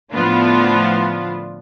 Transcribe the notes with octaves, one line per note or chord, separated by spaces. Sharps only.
A2 D3 F3 B3 D4 F4